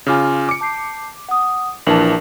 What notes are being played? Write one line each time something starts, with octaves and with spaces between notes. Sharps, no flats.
C#3 F4 G#5 D6 F6
D6 C#7
A5 G6 C7
F#5 D#6
A#1 E3 D4 A#4 A5 F#7